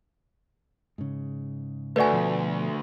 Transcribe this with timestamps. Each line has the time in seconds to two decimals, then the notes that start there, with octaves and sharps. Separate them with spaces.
0.98 G#2 C#3
1.96 D2 A3 F#4 B4 D5 G#5
2.13 B2 F3